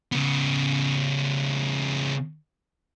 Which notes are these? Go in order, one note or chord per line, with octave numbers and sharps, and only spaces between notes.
C#3 B3